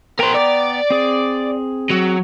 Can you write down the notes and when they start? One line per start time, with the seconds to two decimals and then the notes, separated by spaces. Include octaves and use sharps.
0.19 B3 A#4 C5 G5 A#5
0.34 D5
0.90 C4 G#4
1.90 F#3